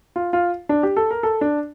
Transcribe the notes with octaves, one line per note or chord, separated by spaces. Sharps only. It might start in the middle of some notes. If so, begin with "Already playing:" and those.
F4
F4
D4
G4
A4
A#4
A4
D4